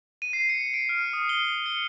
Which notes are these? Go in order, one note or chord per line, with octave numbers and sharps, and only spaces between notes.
D#7
C7
C#7
D7
F6
D#6
G7
C#7